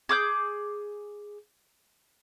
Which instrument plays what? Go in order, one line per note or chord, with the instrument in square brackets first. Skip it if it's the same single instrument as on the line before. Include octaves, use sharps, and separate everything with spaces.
[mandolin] G#4 D6 F6 G6